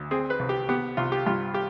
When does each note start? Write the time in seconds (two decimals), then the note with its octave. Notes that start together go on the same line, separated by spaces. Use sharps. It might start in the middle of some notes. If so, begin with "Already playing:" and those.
Already playing: D2
0.11 C4 G#4
0.30 B4
0.39 C2
0.49 G4
0.69 B3 G4
0.97 C2 F4
1.12 G4
1.27 G2 F4
1.54 G4